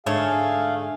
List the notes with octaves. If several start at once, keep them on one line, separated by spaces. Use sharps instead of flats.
G#2 D3 A3 G#4 C#5 F5